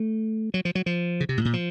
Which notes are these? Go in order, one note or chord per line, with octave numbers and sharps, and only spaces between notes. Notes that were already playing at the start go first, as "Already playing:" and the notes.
Already playing: A3
F#3
F3
F#3
F3
C#3
C3
A2
A#2
F3